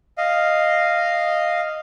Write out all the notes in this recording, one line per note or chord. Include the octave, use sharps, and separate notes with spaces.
D#5 F5